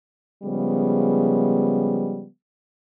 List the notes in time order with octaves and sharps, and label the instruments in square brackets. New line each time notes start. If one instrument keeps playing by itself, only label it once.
[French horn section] C#3 F3 G3 G#3 B3